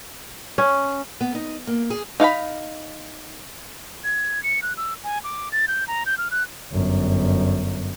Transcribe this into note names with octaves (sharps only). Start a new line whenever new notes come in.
C#4
B3
D#4
A#3
G#4
D#4 F5 F#5 B5
G#6
C#7
F#6
E6
G#5
D6
A6
G6
A#5
G6
F6
F#6
G1 F#2